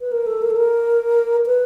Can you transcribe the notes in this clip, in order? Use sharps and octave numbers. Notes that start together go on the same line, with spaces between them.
B4
A#4
A4
A#4
A4
A#4
B4